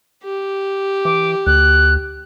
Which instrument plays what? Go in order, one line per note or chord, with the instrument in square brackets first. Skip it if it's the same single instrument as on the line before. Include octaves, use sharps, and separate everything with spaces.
[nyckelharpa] G4
[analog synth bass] E3 [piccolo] D6
[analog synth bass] D2 [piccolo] F#6